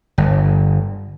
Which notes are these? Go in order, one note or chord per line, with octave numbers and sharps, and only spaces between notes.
G1